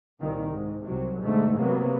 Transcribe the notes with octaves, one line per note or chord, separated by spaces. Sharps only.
C2 A#2 D#3
G#2
C2 C3 F#3
G#2 B2 D3 A3
C3 F#3 A#3 B3